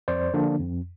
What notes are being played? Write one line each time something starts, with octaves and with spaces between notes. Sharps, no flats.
F2 C5 D5
D3 F3 A#3 D4
F2